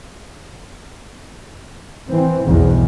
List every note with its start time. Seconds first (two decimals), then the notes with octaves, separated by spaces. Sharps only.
2.10 E3 C4
2.47 B1 E2 G2 B2